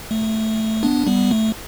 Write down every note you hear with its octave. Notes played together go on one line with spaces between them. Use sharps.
A3
B3 D4
G3 B3
A3